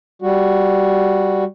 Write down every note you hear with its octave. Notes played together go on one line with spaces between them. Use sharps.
G3 F#4